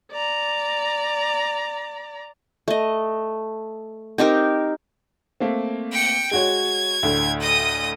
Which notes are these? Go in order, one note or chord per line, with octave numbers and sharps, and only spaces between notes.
D5 A#5
A3 D#5
C4 D#4 G4 A#4
A3 A#3 C4
G5 C#7
G#3 F#4 C#5 G#6
D2 A2 D3
D#5 D#6